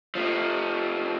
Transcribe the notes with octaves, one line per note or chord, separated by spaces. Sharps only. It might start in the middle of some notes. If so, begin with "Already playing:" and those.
F3 A3